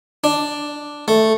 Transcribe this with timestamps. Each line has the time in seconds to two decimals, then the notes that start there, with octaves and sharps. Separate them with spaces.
0.24 D4
1.08 A3